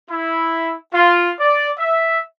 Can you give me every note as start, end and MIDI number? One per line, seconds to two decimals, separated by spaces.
0.10 0.74 64
0.93 1.33 65
1.40 1.69 74
1.78 2.20 76